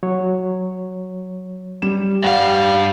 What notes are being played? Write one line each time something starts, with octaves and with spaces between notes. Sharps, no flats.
F#3 C#5
G3 E7
G2 G3 F5 F#5